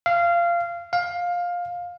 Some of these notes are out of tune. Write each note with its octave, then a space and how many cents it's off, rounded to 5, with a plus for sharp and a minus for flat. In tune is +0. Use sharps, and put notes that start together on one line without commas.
F5 -20
F5 +15